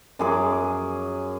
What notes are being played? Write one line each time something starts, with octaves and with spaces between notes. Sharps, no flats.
F#2 G#4 D6